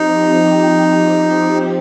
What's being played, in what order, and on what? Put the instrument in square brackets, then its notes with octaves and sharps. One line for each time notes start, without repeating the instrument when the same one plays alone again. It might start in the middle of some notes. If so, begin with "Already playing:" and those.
Already playing: [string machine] F3 C4 G4 [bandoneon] D#4